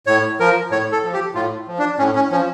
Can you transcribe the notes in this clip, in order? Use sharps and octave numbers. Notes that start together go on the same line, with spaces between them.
A2 C#5
F3 A#4
A2 C#5
A4
F3
G4
A2 F4
F3
D4
A2 C#4
C#4
F3 C#4